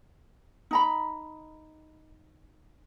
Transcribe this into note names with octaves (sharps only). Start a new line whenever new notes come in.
D#4 A#5 B5